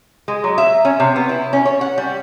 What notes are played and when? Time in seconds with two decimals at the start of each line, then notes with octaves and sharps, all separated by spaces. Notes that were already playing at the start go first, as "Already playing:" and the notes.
0.28 G#3
0.44 F#3
0.58 E5
0.85 C#4
1.00 C3
1.16 B3
1.29 E4
1.53 C#4
1.65 C#5
1.81 F#5
1.98 G3